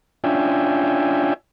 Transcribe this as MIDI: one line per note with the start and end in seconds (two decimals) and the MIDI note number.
0.24 1.34 61
0.24 1.34 62
0.24 1.34 65
0.24 1.34 76
0.24 1.34 79
0.24 1.34 80